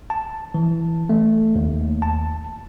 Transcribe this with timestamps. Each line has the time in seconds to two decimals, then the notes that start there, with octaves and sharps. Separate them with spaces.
0.10 A5
0.54 E3
1.09 A3
1.56 D#2
2.02 A5